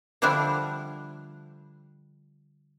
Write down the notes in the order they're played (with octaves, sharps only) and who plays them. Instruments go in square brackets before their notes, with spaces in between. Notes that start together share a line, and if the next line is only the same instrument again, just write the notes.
[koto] D3 F3 G3 D4 E4